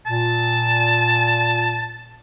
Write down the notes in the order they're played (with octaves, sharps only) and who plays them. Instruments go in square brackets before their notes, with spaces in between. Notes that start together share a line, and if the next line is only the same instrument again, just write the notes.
[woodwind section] A#2 [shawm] A5